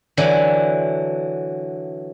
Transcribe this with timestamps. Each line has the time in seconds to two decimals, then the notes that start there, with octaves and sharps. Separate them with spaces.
0.17 D3 E3 F#3